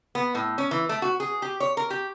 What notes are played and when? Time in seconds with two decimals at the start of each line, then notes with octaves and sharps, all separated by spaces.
0.15 B3
0.35 A2
0.58 C#4
0.71 E3
0.89 A3
1.02 F#4
1.20 G#4
1.42 G4
1.60 C#5
1.77 A#4
1.90 G4